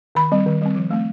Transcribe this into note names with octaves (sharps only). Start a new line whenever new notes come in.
D#3 B5
G3 C4
D#3
G3 C4
F3
A3 C4